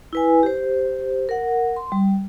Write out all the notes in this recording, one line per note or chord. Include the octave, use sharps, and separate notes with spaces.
E4 B4 G#5
G4 C5
A#4 F#5
C6
G3